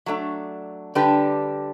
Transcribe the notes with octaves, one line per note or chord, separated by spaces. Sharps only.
F#3 A3 D4
D3 G3 D4 G4 B4